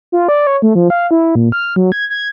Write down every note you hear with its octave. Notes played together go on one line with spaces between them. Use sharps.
F4
D5
C#5
A3
F3
F5
E4
A#2
F6
F#3
G#6
G#6